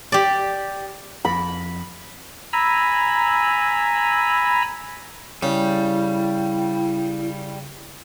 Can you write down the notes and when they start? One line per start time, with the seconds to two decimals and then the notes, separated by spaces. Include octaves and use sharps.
0.12 G4 D5
1.25 F2 B5
2.53 G#5 A#5 B5 E6
5.42 C#3 G3 E4